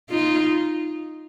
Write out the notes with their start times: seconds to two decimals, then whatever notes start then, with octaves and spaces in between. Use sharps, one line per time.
0.10 D#4 F4